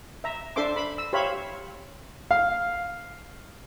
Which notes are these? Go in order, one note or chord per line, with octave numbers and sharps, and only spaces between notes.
E5 A#5
D4 A4 C5 E5 C6 D6
B5
E6
G4 C5 C#5 E5 F5 B5
F5